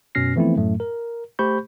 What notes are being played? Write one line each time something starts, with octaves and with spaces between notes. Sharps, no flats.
F#2 B2 C#4 F6 A#6 C7
E3 F3 A3 B3 C4 E4
F#2 A2 F#3 A3
A#4
A3 G4 C5 B5 C#6 G6